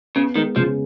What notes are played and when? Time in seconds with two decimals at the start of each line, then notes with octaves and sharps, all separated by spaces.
0.16 C#3 B3
0.35 D#3 G#3
0.56 C#3 F3